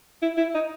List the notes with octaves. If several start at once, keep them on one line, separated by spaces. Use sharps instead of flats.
E4
E4
D#4